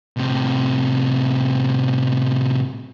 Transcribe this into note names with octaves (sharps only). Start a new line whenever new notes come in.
A2 C3